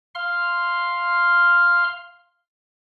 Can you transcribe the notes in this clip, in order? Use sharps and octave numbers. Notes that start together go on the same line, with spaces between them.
F5 C6 F6